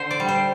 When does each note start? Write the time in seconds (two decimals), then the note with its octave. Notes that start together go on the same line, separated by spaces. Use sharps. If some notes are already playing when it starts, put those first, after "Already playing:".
Already playing: D3 C5
0.11 D5
0.20 G3
0.28 C5